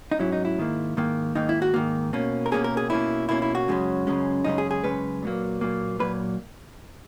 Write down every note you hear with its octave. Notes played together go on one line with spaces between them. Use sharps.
D#4
G#2 F#3 C#4 E4
D#4
E4
G#2 D#3 A#3
G#2 D#3 A#3
G#2 D#3 A#3 D#4
E4
F#4
G#2 D#3 A#3
B2 A#3 C#4
A#4
B2 A#3 C#4 G#4
A#4
G#4
B2 A#3 C#4 E4
B2 A#3 C#4 E4
E4
F#4
F#2 C#3 G#3 C#4
F#2 C#3 G#3 C#4
F#2 C#3 G#3 C#4 D#4
G#4
G#4
F#2 C#3 G#3 C#4 B4
A#2 F#3 A#3
A#2 F#3 A#3
A#2 F#3 A#3 B4